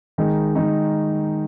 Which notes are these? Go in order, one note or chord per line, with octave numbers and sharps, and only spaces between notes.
D#3 G#3 D#4
D#3 G#3 D#4